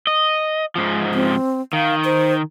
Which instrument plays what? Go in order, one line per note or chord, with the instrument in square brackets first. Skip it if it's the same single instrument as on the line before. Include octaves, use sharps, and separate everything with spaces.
[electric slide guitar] D#5
G#2 F3
[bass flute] C4
[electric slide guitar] D#3 [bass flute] F5
[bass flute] C5